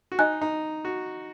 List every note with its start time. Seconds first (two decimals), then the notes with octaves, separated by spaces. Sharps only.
0.12 F#4
0.19 D#4 D#5 G#5 F#6
0.41 D#4
0.85 F#4